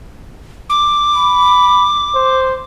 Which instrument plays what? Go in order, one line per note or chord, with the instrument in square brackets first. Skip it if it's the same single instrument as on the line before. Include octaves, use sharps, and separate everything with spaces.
[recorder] D6
[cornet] B5
C5